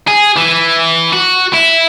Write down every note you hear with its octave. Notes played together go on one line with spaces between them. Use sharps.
G#4
E3
F#4
E4